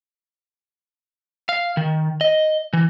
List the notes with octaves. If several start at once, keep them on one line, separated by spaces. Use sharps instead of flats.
F5
D#3
D#5
E3